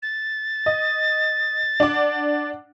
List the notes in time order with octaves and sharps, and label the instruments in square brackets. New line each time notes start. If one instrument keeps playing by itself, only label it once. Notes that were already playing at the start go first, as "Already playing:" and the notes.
[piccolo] A6
[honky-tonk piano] D#5
D4 F#5 D6